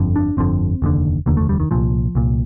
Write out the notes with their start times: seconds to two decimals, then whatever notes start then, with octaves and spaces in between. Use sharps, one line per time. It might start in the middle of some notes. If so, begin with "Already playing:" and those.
Already playing: G1 F2 D3
0.16 D4
0.37 G1 F2 D3 C4
0.82 F1 D#2 D3
1.26 F1 D#2 D3 A#3
1.37 A3
1.49 G3
1.60 D#3
1.71 C2 A#2 F3
2.15 C2 A#2